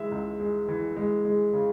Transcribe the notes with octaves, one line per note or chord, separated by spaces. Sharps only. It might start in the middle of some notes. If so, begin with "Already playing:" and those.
Already playing: E3 G#3 E5
C#2
G#3
E3
G#3
G#3
C#3